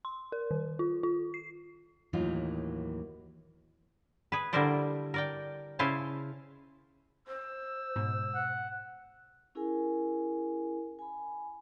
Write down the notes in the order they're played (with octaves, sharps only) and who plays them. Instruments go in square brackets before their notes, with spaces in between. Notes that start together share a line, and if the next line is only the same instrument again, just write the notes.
[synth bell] C6
A#4
D#3
F4
F4
C7
[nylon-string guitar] D#2 A2 E3 F#3 D#4 F4
[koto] G#4 B4
D3 G3 E4 A#4 C5 D5
A#4 D5 G5
C#3 E4 C5 F5 G#5 A5
[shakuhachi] C5 [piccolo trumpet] E6
[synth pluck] G#2 B2
[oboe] F#5
[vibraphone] C#4 E4 G#4 A#4 G#5
G#5 B5